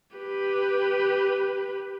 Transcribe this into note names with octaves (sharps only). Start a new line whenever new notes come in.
G4 B4